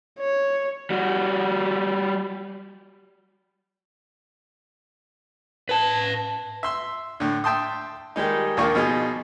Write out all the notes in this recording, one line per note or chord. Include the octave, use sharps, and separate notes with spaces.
C#5
G3 F#4
B4 A5
E5 C6 E6
A2 D3
E5 G5 A5 C6 D#6
D#3 G3 G#3 D#4
A#1 D#2 A#3 D4 F4 C#6
B2 F3 D#4 G#4